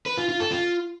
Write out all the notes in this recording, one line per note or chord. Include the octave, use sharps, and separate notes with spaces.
B4
F4
F4
A4
F4